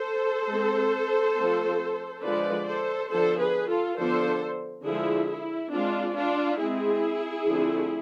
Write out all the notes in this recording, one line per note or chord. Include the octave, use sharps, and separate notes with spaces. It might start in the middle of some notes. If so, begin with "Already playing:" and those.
Already playing: A4 C5
G#3 C4
F3 A3 C4
D3 F3 G#3 B4 D5
A4 C5
D3 F3 B3 D4 A4 C5
G#4 B4
F4 A4
D3 F3 B3 D4 A4 C5
D3 F3 G#3 E4 G#4
E4
G#3 C4 D4 F4
D4 F4
G#3 C4 E4 G#4
D3 F3 A3 C4